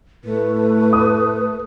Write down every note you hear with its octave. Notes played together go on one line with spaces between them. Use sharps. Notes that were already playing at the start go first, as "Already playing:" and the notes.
A2 A3 B4
D#6